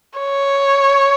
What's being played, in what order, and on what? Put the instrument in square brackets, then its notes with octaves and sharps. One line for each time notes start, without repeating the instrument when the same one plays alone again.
[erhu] C#5